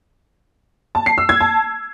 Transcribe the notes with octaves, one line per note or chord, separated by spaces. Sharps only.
A5
C7
E6
G#6
A5